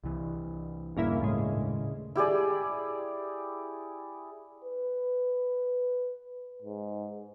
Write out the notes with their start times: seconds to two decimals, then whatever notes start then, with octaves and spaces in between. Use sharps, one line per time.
0.04 C2 E3
0.97 D#1 G2 C#3 A#3 E4
1.21 A2 C#3 G#3
2.15 E4 G4 G#4 D5
4.64 B4
6.62 G#2